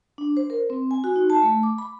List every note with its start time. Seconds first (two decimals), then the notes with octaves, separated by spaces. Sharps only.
0.18 D4
0.37 C5
0.50 A#4
0.70 C4
0.91 G#5
1.04 F#4
1.16 D#4
1.30 A5
1.43 A3
1.63 D6
1.78 B5